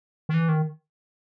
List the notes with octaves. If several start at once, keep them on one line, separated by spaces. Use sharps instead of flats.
D#3
E3
D#3